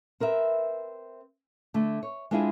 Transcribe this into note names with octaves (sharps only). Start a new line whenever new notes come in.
C4 A#4 B4 E5
D3 A3
C#5
G#3 C4 D4 E4 F4 G#4